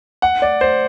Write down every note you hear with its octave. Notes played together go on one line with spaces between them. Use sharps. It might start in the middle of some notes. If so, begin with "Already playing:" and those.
F#5
D5
C5